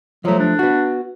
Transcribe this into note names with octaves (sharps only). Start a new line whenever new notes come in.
F3 F#3 A3
D4
B3 F#4